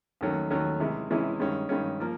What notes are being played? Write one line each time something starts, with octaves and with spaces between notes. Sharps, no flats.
D#2 D#3 F#3 A3 C#4
D#2 D#3 F#3 A3 C#4
C3 E3 G#3 C#4 E4
C3 E3 G#3 C#4 E4
G2 D#3 G#3 C#4
G2 D#3 G#3 C#4
F3 A#3